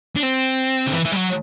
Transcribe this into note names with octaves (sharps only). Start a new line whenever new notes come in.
D4
C4
D3
E3
E3
G3
F#3